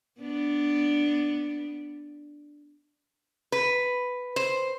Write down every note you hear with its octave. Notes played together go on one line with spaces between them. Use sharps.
B3 D4
B4
C5